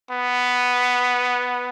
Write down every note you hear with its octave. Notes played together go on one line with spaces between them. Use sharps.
B3